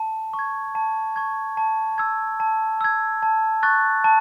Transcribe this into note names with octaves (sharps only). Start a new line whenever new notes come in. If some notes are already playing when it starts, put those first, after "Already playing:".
Already playing: A5
C#6
G#6
A5
C#6 G#6
A5
E6 G#6
A5
E6 G#6
A5
C#6 F#6 A6
A5